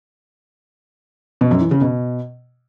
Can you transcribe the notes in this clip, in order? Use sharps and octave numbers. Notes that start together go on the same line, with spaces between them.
B2
F#2
E3
C#3
B2